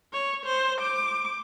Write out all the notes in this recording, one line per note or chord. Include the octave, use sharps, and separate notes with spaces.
C#5
C5
D6